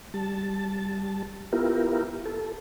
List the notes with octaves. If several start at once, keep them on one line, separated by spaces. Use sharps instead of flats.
G3 A5
B3 E4 F4 G4 A#4
A4